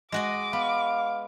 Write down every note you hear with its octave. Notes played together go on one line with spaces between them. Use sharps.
G#3 F#4 D#5 D6
B3 F5